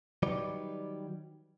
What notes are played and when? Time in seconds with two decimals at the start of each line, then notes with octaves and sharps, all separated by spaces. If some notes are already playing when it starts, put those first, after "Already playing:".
0.23 D#3 F#3 G3 D#4 B4 D5